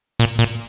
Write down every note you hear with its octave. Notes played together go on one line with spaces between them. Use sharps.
A#2
A#2